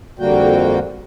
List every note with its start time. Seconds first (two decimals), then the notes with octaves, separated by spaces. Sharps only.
0.19 F2 D3 G3 A#3 F#4 G5